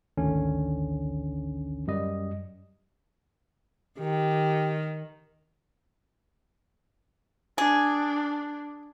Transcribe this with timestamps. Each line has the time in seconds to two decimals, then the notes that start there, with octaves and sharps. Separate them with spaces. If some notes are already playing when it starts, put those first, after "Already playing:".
0.18 G#1 D2 D3 D#3 C#4
1.87 F#2 G3 D#5
3.99 D#3 G4
7.58 D4 G#4